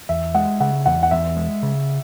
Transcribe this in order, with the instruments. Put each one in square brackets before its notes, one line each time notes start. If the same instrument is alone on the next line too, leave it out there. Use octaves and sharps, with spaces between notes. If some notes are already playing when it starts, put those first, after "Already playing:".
[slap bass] E2 [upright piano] E5
[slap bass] G#3 [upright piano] F#5
[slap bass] C#3 [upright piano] F#5
[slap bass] E2 [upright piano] F#5
[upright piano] F#5
[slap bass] E2 [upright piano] E5
[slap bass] G#3
C#3